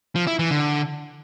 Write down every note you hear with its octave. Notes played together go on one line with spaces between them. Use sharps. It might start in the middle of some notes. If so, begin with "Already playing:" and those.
F3
E4
E3
D3